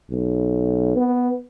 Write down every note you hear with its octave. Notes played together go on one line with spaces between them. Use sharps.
B1
B3